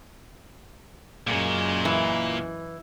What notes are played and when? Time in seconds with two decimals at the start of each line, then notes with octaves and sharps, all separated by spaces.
1.27 F#2 A#2 C#3 G#3
1.85 E3